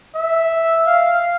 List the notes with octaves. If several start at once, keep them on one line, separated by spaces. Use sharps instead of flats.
E5
F5